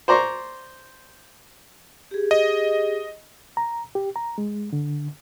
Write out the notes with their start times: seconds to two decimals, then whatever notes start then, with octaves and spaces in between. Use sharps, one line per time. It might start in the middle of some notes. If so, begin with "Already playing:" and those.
0.08 C5 D5 A#5 C6 C#6
2.11 G4 G#4
2.31 D#5
3.57 A#5
3.95 G4
4.16 A#5
4.38 G#3
4.73 D3